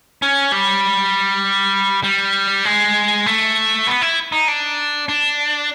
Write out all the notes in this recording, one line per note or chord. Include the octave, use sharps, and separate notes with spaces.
C#4
G3
G3
G#3
A3
B3
E4
D#4
D4
D4